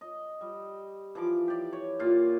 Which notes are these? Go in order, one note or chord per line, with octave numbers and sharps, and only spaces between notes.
D#5
G3
E3 F3 D6
G4 D5
C#5
A#2 F4 F5